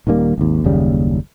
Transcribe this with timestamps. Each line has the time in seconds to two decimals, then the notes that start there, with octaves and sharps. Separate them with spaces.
0.07 D#1 D#3 G3 A#3
0.38 G#1 D#2
0.64 F#1 D#2 C#3 G3